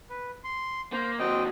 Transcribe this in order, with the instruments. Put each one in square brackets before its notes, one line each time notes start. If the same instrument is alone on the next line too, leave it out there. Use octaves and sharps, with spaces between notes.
[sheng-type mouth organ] B4
C6
[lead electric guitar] A#3 [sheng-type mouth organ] C5
[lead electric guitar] D#2 F#3 [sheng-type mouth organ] C4 D#5 G5